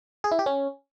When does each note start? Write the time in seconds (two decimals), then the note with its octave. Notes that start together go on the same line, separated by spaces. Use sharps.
0.24 G#4
0.31 E4
0.39 G4
0.46 C#4